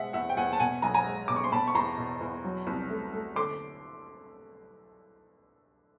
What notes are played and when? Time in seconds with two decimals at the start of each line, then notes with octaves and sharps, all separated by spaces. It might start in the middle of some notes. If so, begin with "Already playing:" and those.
Already playing: B2 G#3 E5 F#5
0.13 E2 E5 F#5
0.29 G5
0.37 E2 F#5 G#5
0.53 A5
0.59 B2 F#5 G#5
0.82 B1 G#5 A#5
0.94 G#5 A#5
1.05 G#3
1.28 B2 D6
1.36 C#6
1.44 C6
1.52 B2 A5 B5
1.68 C#6
1.75 E2 A#5 C6
1.98 B2
2.21 E2
2.44 F#3
2.67 C2
2.90 A3
3.13 A3
3.35 D3 C6 D6